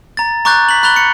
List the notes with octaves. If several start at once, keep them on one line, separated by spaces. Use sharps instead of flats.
A#5 A6
A#5 C#6 D6 F#6 G6 A6
B6 F#7
B5 F#6 A6 F7 G7
C#7